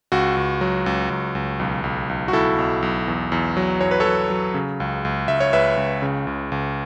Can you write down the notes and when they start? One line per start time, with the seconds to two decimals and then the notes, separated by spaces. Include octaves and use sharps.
0.12 C#2 F#4
0.37 C#2
0.61 F#3
0.86 C#2
1.10 C#2
1.35 C#2
1.60 B1
1.84 B1
2.09 B1
2.28 F#4
2.33 B1 E4 A4
2.58 B1
2.82 B1
3.08 E2
3.32 E2
3.57 F#3
3.81 E2 C#5
3.91 B4
4.00 A4 C#5
4.06 F#3
4.30 F#3
4.54 C#3
4.80 C#2
5.05 C#2
5.28 C#2 E5
5.40 C#5
5.53 C#2 B4 E5
5.77 C#2
6.02 C#3
6.27 C#2
6.52 C#2